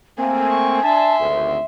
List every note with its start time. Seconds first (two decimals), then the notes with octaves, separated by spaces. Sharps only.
0.18 A3 A#3 C4 G#5
0.50 C#6
0.83 D4 E5 A5 C6
1.19 G#1 D2